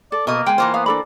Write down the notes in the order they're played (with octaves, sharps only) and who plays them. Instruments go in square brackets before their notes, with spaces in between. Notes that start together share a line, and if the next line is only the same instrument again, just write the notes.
[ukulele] A4 [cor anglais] D5
[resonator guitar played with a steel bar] B2 D#5 [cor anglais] A#3
[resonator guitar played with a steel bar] G#3 [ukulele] G5 G#5
[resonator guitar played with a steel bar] E3 A#3 C5 [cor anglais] F4
[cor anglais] B3 [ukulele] F5
[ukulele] D4 A4 B5 [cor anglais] D5